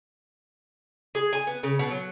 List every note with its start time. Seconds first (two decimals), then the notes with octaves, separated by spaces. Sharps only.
1.15 G#4
1.33 G#5
1.47 B3
1.63 C#3
1.79 B2
1.91 F#3